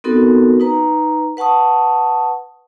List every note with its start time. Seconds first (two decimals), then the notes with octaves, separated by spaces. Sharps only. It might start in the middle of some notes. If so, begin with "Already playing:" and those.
0.04 B3 C4 D#4 F#4 A4 A#4
0.60 D#4 B4 A#5
1.37 B4 F#5 A5 C#6 D#6